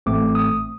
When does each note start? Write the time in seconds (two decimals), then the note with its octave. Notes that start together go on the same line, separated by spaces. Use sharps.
0.06 A1 A2 A3 C4 D6
0.35 D#6